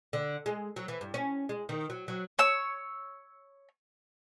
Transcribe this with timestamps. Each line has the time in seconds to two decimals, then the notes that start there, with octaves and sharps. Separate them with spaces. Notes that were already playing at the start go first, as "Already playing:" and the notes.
0.13 D3
0.46 G#3
0.76 F#3
0.88 E3
1.01 G2
1.14 C#4
1.49 G#3
1.69 D#3
1.90 F#3
2.08 F#3
2.39 C#5 E6